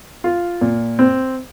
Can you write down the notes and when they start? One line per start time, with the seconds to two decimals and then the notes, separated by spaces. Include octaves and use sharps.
0.24 F4
0.61 A#2
0.99 C4